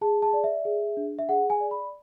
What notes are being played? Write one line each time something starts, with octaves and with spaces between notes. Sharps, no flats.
G#4 A5
A5
D5
E5
G#4
D4
E5
G#4 F#5
G#5
D5
B5